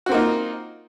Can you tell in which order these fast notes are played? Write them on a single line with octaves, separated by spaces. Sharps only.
F#4 C4 A#3 D#4 F4